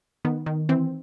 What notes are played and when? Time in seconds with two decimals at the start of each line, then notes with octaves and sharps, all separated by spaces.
0.25 D#3 B3
0.46 D#3
0.69 E3 C4